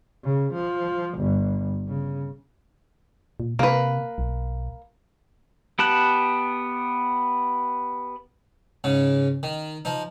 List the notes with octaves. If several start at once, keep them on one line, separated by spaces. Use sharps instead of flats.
C#3
F3
G1
C#3
A#2
C3 A#3 B4
B1
B3 G4 A5 F#6
G#2 C#3
D#3
F3 D#4